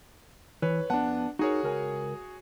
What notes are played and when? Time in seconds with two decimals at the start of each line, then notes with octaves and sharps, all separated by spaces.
0.62 E3 B4 C#5
0.90 F2 B3 D4 F#5 A5
1.39 D#4 F#4 G#4 A#4 C#5
1.63 C#2 A#4 G#5